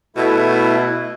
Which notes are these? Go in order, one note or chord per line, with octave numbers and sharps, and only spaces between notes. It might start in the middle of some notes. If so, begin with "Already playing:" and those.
B2 A3 E4